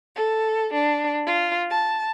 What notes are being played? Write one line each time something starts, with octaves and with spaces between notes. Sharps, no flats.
A4
D4
F4
A5